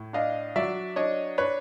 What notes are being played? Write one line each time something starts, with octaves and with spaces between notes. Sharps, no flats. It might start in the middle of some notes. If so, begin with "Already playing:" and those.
Already playing: A2
D4 D#5 F5
F#3 D5 E5
D4 C#5 D#5
D4 B4 C#5